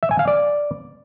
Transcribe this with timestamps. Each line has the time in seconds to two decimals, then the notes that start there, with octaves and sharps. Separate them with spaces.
0.03 E5
0.11 G#5
0.19 F5
0.28 D5